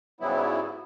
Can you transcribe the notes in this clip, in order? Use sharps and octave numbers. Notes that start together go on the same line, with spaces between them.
G#2 C#3 F#3 G3 B3 E4